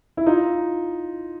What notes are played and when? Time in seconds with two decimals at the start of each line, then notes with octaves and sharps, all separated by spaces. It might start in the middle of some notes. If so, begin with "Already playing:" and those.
0.17 E4
0.26 D#4 F4